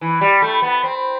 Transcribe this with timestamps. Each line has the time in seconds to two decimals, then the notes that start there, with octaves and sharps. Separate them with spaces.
0.01 E3 B5
0.21 G3
0.42 A3
0.62 B3
0.83 C4